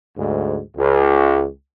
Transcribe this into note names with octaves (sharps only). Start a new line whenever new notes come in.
D2 G#2
C#2